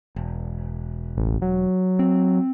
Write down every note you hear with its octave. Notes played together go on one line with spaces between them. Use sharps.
E1
A1
F#3
C4